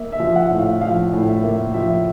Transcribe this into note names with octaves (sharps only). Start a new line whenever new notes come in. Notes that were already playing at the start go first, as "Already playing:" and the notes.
Already playing: A#3 E5
E5
F3
F#5
A2
F5
F3 F5
A2
E5
A#3
F3 E5